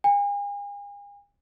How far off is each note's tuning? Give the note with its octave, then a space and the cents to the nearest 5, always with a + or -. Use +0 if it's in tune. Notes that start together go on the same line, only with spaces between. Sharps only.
G#5 -40